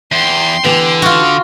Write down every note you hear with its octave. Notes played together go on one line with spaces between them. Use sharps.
E2 G5 C6
D3 E3 B3 G4
F4 F#4